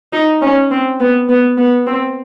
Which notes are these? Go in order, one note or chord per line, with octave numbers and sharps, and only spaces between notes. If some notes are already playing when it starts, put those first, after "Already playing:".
D#4
C#4
C4
B3
B3
B3
C4